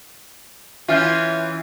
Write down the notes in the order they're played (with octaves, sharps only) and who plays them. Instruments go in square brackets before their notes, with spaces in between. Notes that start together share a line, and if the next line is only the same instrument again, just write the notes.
[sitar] E3 C#4 F4 [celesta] E5 F6 G6